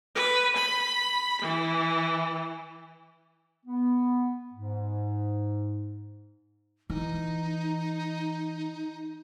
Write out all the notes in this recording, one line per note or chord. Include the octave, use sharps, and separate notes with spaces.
B4
B5
E3
B3
G#2
E3 D#4